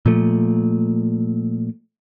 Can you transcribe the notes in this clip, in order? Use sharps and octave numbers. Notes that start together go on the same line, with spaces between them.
A#2 F3 A3